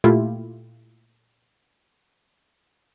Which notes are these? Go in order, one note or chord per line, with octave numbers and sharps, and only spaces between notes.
A#2 A3 E4 F4 G4